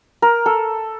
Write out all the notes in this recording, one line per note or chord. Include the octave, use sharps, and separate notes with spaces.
A#4
A4